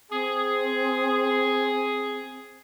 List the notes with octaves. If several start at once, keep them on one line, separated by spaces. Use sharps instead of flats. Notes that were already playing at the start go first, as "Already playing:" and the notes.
C4 G#4